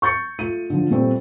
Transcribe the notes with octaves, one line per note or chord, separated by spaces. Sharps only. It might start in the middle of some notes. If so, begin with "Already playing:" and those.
C#6 G6 A6 C#7
A3 F4 D#7
D3 F3
A#2 G3 A3 C4